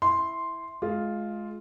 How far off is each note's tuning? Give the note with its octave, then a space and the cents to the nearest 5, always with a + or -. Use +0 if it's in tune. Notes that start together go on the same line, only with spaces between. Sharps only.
E4 -5 C6 +0
G#3 +25 F4 +0